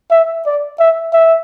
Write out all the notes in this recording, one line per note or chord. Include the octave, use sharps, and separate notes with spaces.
E5
D5
E5
E5